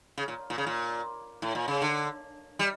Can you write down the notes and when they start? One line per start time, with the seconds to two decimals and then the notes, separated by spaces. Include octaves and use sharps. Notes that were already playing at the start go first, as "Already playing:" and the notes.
0.18 C#3
0.28 A#2
0.50 A#2
0.58 C#3
0.66 A#2
1.42 A2
1.55 A#2
1.68 C#3
1.82 D3
2.59 G3